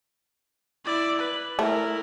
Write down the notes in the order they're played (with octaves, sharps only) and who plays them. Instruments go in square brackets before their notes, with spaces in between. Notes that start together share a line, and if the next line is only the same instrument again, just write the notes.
[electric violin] E4 D5
B4
[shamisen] A3 [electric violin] E4 A#4